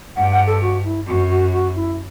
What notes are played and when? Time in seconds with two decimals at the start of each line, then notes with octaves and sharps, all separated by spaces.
0.16 G2 F#5
0.30 F#5
0.46 A4
0.62 F#4
0.84 E4
1.06 F#2 F#4
1.29 F#4
1.52 F#4
1.75 E4